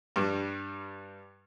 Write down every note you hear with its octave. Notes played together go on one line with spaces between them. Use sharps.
G2 G3